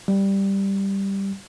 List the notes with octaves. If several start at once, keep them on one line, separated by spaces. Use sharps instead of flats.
G3